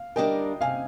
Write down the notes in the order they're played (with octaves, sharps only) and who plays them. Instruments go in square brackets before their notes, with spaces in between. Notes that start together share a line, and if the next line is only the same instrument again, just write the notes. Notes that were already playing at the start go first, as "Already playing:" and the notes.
Already playing: [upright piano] F5
[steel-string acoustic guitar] G3 D4 G4 A#4 [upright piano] D#5 G5
[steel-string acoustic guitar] C3 [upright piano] F5 G#5